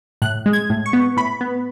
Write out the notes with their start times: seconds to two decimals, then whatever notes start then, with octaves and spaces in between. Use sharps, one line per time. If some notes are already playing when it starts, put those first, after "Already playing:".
0.22 A2 F#6
0.46 G#3
0.53 G#6
0.70 A2
0.86 C#6
0.93 B3
1.17 A2 B5
1.41 B3